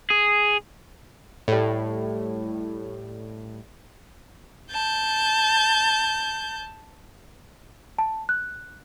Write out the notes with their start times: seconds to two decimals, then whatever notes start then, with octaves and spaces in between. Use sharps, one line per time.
0.10 G#4
1.48 A2 G3
4.71 A5 G6
7.98 A5
8.29 F#6